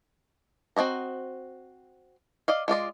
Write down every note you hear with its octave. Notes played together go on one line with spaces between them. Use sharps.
C4 F#4 D#5 A#5
D5 D#5 F5
G#3 F4 D5 D#5